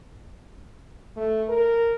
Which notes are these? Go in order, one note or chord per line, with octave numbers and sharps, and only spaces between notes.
A3
A#4